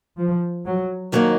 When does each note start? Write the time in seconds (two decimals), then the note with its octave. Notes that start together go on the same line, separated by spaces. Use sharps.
0.19 F3
0.65 F#3
1.12 F2 D#3 F#3 A#3 D#4